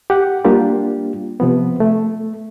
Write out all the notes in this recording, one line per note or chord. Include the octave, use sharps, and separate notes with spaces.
G4 F#5
G3 A#3 D4 F4 G4
C3 F3 B3
A3